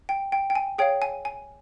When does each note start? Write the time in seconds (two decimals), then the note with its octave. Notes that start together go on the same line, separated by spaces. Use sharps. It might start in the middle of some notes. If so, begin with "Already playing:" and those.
0.09 G5
0.32 G5
0.50 G5
0.55 G#5
0.78 G#4 C#5 F5 G5
1.02 G#5
1.25 G#5